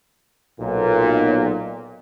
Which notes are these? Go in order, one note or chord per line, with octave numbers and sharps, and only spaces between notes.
B1 A#2